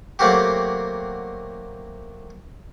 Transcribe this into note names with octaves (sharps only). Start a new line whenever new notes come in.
F#3 A3 A#3 C4 F#4 G4